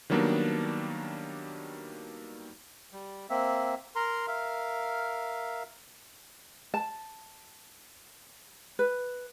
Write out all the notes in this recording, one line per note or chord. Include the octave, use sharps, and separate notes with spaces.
D#3 F#3 G3 A#3 B3 D4
G3
A#3 C4 E5
A#4 A#5 C6
A#4 E5 F5
A5
B4